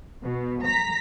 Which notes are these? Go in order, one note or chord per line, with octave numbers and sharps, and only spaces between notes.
B2
A#5 B6